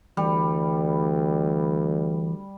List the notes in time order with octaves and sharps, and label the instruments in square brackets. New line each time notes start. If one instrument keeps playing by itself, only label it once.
[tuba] D2 [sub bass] E3 [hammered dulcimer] G3